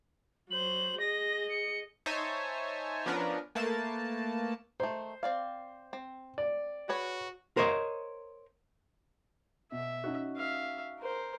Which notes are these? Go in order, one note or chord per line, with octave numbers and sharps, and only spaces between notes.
F#3 C5 F#7
G#4 D#5 A#6
C#7
D#4 C5 C#5 E5 G#5 A5
F3 B3 C#4 D4 A#4 B4
A3 A#3 B4 A5
D#3 A3 C5
C4 D5 F5
C4
D5
F#4 G#4 B4 C#5
A#4 C5 C#5 D#5
B2 E5
C#4 D#4 F#4
E5 F5
A#4 C5